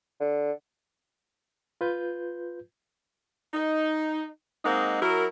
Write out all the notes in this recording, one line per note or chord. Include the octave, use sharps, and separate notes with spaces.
D3
F4 B4 G6
D#4
G#3 A#3 C4 D#4 F#5
F#3 E4 F#4 A#4